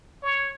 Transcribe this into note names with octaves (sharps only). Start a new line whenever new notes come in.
C#5